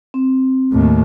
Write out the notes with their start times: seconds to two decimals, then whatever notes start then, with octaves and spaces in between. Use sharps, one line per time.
0.14 C4
0.72 D#2 A2